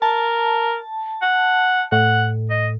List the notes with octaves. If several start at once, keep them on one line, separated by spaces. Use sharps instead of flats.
A#4 A5
F#5
A2 F#5
D#5